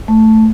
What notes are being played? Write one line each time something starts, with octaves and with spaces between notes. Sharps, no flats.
A3